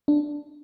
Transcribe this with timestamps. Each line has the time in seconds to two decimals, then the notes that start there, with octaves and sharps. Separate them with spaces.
0.08 D4